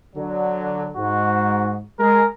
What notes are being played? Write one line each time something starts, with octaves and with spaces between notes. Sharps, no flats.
D3 F#3 D4
G#2 F#4
G#3 G#4 A#4